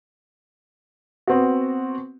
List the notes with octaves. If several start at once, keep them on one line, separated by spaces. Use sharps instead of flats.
B3 C4 F#4